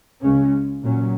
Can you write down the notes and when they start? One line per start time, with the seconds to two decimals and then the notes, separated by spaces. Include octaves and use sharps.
0.21 C#2 C#3 G#3 C#4
0.83 A#2 F#3 C#4